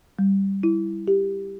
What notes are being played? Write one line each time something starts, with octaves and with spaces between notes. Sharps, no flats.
G3
E4
G4